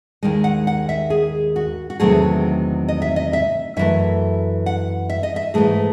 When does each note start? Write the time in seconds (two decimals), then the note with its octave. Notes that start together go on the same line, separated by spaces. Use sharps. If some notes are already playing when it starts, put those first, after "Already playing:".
0.23 D#2 D#3 G#3
0.44 F#5
0.67 F#5
0.89 E5
1.10 G#4
1.56 F#4
1.90 F#4
2.00 E2 C3 D#3 F#3 A3 G#4
2.89 D#5
3.02 E5
3.16 D#5
3.33 E5
3.77 F#2 E3 A3 E5
4.66 F#5
5.10 E5
5.23 D#5
5.36 E5
5.54 G#2 E3 A3 G#4